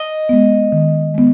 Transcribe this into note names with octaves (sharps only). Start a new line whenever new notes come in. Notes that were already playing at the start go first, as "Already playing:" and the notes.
Already playing: D#5
G#3 B3
D#3
G#3 B3